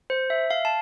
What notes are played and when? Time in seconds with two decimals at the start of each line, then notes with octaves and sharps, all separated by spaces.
0.10 C5
0.30 E5
0.51 F5
0.65 A5